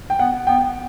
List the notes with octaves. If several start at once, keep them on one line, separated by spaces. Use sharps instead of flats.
G5
B3 F#5
B3 G5